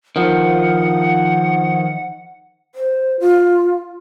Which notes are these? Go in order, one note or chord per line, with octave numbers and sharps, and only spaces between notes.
D#3 F3 F#5
C5
F4